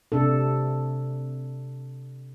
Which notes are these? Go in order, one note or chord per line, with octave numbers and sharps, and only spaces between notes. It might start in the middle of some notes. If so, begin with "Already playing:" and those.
C3 D4 A4